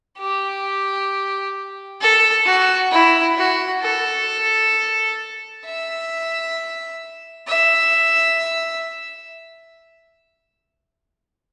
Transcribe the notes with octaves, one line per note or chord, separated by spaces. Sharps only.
G4
A4
F#4
E4
F#4
A4
E5
E5